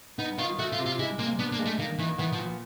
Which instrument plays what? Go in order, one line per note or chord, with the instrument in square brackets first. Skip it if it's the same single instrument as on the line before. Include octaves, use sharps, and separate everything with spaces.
[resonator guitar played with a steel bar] B3 [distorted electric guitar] D#4
[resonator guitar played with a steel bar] D#3 [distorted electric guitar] F4
[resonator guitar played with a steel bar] A3 [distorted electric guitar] F#4
[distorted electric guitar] F4
[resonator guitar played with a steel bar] C3
[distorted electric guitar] F4
[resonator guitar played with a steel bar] G#3 [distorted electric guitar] E4
[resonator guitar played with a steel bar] C3 [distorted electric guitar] A#3
[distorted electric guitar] B3 [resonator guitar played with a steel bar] D4
[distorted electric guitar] A#3
[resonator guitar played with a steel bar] G#3
[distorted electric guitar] A3
[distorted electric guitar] D#3 [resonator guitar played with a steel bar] A#3
[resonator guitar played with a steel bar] D#3 [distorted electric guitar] E3
[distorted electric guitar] E3 [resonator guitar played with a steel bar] B3
[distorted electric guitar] F3
[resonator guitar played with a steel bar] A#2